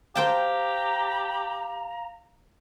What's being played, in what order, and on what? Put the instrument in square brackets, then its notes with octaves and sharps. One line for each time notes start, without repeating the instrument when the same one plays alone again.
[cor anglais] G4 [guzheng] C5 G5 A5 [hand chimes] F5 [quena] A#5